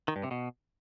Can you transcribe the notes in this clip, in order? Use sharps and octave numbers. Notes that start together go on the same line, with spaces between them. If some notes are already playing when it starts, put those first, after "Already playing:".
D#3
G2
C3
B2